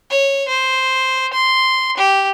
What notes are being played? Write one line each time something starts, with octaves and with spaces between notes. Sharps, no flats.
C#5
C5
C6
G4